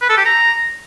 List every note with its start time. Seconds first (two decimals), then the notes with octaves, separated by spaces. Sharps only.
0.01 B4
0.09 A4
0.17 G4
0.25 A#5